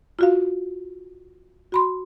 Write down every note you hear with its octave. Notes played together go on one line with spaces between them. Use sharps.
F4 F#4 F5
F#4 B5 C6